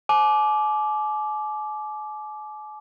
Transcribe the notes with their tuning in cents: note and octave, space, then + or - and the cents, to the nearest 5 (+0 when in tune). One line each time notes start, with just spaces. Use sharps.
G#5 +45 D6 +0